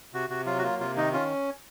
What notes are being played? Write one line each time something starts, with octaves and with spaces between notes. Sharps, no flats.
C3 F#4
C3 F#4
F#3 F4
F#4
A#3 F4
C3 F4
D#3 D#4
C#4 F4